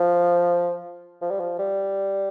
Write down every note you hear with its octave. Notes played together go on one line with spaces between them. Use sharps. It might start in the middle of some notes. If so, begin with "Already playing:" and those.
Already playing: F3
F3
G3
F3
G3